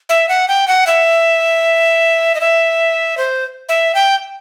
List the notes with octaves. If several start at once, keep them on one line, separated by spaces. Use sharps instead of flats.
E5
F#5
G5
F#5
E5
D#5
E5
C5
E5
G5